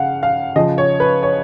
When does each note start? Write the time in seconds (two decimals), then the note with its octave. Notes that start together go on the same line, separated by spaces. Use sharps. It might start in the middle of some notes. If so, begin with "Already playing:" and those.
Already playing: C#3 F5 F#5
0.23 F5
0.56 C#3 F3 D#5
0.78 C#5
1.00 B4
1.23 C#5